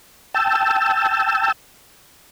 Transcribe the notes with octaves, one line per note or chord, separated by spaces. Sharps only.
G5 A5 E6